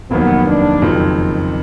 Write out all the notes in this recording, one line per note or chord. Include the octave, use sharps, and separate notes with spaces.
F1 D#2 D#3 F#3 B3
D4
F#1 F2 D#3 F#3